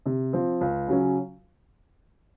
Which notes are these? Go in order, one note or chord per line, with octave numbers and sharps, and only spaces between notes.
C3
F3 C4
C#2
C#3 F#3 C#4